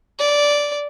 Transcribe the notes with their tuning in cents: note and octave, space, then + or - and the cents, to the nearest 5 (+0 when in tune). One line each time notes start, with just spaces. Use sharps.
D5 -10